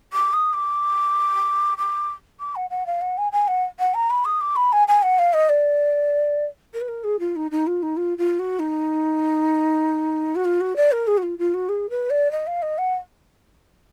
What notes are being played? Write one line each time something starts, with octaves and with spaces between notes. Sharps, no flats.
D6
D#6
D6
D6
D6
F#5
F#5
F5
F#5
G#5
G#5
F#5
F#5
A#5
B5
D#6
D6
B5
G#5
G#5
F#5
F5
D#5
D5
A#4
B4
A#4
G#4
F4
D#4
D#4
F4
D#4
F4
F4
F#4
D#4
F#4
F4
F#4
D5
A#4
G#4
F#4
F4
F4
F#4
G#4
B4
D5
D#5
F5
D#5
F#5